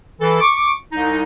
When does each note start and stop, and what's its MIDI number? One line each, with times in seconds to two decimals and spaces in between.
0.20 0.37 52
0.20 0.37 69
0.41 0.72 85
0.41 0.72 86
0.93 1.23 36
0.93 1.23 63